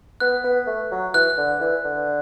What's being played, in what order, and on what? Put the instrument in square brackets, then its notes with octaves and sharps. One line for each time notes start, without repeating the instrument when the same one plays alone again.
[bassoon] B3 [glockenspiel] F#6
[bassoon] B3
A3
F#3
[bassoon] E3 [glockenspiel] F#6
[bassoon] D3
E3
D3